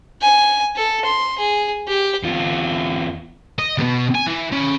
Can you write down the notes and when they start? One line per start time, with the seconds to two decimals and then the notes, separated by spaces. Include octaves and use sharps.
0.22 G#5
0.76 A4
1.05 C6
1.39 G#4
1.88 G4
2.23 E2 F4
3.59 D#5
3.78 D#2 B2
4.15 G#5
4.27 E3
4.52 C#4 B5